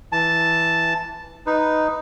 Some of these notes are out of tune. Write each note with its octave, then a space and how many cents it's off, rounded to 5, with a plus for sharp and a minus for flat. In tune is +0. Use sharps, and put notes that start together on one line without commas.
E3 +0 A5 +0
D#4 +0 B4 +0